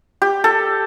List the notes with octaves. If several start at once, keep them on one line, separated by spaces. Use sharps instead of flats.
G4
A4